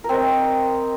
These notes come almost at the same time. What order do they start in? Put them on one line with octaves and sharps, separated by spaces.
A#4 C4 D#5